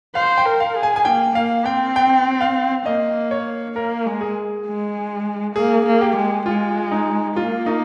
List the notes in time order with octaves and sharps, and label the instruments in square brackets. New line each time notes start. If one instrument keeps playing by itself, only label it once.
[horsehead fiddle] C5 [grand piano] F5
[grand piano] G5
[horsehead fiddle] A#4
[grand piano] F5
[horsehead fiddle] G#4
[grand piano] G#5
G#5
[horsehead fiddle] A#3 [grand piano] G5
[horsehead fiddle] A#3 [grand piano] F5
[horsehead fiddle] C4 [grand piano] G5
[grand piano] G5
F5
[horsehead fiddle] A#3 [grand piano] D#5
[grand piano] C#5
[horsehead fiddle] A#3 [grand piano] A#4
[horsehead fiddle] G#3
[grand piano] G#4
[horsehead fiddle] G#3
[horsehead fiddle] A#3 [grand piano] G#4
[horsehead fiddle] A#3
[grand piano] G4
[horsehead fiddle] G#3
[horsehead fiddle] G#3 [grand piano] F4
[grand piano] D#4
[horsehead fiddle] A#3 [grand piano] F4
[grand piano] D#4